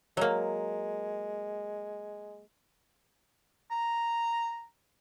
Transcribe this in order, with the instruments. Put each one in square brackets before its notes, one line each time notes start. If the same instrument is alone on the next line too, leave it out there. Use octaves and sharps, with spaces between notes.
[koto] F#3 A#3 [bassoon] G#3
[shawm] A#5